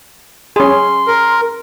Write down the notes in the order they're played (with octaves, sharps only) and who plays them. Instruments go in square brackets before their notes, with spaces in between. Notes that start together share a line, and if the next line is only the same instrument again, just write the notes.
[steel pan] C#4 G#4 [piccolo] C6
[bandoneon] A#4